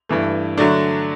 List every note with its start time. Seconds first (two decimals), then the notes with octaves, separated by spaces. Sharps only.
0.09 G2 E3 A3
0.58 D3 F#3 A3 D4